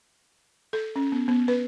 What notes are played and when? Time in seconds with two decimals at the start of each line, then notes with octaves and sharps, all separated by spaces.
0.73 A4
0.96 C#4
1.12 B3
1.28 B3
1.48 B4